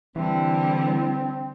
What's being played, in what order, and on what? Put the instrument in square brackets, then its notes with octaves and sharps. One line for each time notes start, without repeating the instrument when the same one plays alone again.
[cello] D3 G3 [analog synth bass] E3 [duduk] C4